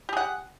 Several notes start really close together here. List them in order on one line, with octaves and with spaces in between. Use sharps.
G4 G#4 F#5